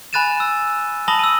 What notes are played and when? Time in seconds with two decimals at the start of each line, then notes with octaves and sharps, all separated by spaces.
0.13 G#5 B5 F#6 A6 D#7 E7
0.40 E6
1.08 A5 B5 D#6 A#6 F#7 G7
1.19 E6 D#7